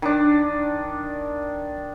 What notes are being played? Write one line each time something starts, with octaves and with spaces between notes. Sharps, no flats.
D#3 D4